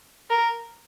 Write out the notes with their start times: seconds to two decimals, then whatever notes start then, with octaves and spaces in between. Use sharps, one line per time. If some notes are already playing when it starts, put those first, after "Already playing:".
0.30 A#4